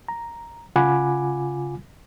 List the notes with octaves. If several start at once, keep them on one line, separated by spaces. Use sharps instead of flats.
A#5
C#3 F4 F#5 G#5 B5 D6